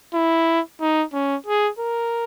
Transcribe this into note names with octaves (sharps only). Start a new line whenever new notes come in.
E4
D#4
C#4
G#4
A#4